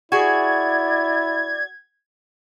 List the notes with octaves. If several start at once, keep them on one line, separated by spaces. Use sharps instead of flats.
E4 F#4 G#4 D5 G#6